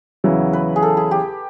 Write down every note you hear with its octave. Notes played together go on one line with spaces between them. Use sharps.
E2 C#3 F#3 B3 E4
B4
G#4
A4
G#4
G4